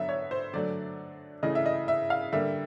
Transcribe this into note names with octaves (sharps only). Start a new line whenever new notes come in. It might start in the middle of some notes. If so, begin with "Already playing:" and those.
Already playing: D3 F#3 B3 E5
C#5
C5
D3 F#3 A3 D5
C#3 E3 A3 D#5
E5
D#5
E5
F5
D3 G3 A#3 E5